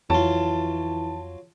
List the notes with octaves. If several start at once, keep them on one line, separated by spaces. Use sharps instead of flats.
F2 E3 F#3 F4 A5